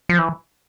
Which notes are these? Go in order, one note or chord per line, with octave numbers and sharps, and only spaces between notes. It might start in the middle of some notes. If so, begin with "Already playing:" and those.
F3
E3